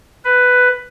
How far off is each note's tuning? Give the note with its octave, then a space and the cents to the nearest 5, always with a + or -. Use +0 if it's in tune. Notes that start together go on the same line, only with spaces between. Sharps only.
B4 +10